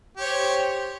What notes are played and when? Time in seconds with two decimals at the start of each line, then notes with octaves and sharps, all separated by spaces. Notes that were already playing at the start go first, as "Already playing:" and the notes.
0.17 G4
0.20 C#5
0.24 C5